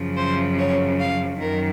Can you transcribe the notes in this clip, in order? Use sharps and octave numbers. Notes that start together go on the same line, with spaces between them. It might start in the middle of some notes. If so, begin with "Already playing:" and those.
Already playing: F#2 C#3 F3
C5
C#5
F5
F#2 D#3 A#4